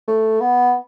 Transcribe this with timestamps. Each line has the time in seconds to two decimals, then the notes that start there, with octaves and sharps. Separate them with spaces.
0.08 A3
0.41 B3